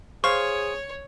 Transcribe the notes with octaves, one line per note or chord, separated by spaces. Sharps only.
G#4 C5 C#5 F5 C#6